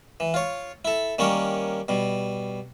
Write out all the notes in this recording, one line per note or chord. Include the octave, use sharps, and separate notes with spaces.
E3
F4 C#5
E4 A4
D#3 G3 A#3 C#4 C#5
B2 G3